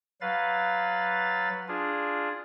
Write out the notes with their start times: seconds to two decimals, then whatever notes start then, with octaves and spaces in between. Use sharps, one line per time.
0.21 F#3 B4 F5 A6
1.68 D4 F4 G#4